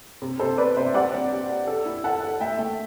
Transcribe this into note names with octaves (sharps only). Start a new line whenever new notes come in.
C3
C3 A4 C5
B3 B4 D5
C3 C5 E5
G3 D5 F#5
C4
G4
G4
A4
E4
A4 F#5 A5
A4
A3 E5 G5
A3